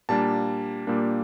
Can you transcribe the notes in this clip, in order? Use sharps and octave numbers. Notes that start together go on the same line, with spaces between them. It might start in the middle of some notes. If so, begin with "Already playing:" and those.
A#2 G3 A#3 D4 A5
A#2 G3 A#3 D4